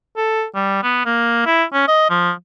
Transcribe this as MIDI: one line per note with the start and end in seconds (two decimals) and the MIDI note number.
0.17 0.45 69
0.55 0.80 55
0.83 1.04 59
1.06 1.42 58
1.46 1.64 64
1.73 1.83 61
1.88 2.10 75
2.10 2.32 53